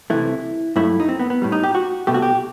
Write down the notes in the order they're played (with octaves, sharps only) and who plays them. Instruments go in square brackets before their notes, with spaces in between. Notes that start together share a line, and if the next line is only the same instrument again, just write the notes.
[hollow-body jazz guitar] C2 C3 E3 A3 E4
G2 F#3 A3 E4
D#4
C4
B3
B3
A2 G3
D#4
G4
F#4
C2 B2 A3 G4
F#4
G4